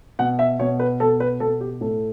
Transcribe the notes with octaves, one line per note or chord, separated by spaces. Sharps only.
B2 F#5
E5
B2 C#5
B4
B2 A4
B4
B2 A4
G4
A2 A4